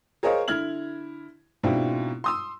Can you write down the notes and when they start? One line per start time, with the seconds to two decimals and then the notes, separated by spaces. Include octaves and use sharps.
0.23 G#4 A#4 C5 C#5 D#5 F5
0.48 D3 E4 F6 G#6 F#7
1.63 G#2 B2 C4 D4 E4 F4
2.24 C6 D#6 E6